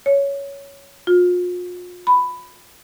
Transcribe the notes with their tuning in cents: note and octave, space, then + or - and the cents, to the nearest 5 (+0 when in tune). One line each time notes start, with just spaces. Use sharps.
C#5 +10
F4 +40
B5 +10